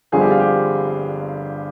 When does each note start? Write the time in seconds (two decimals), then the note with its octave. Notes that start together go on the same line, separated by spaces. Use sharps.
0.12 G1 G2 D3 F3 C4 G#4
0.21 G4
0.31 F4
0.39 G4